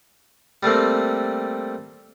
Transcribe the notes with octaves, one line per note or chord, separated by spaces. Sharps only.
G3 A3 A#3 C4